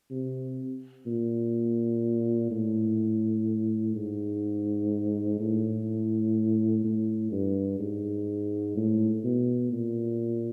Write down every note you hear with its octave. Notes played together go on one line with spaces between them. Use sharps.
C3
A#2
A2
G#2
A2
A2
G2
G#2
A2
B2
A#2